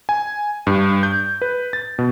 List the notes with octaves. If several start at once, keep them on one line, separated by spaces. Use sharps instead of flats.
G#5
G2
G6
B4
A6
B2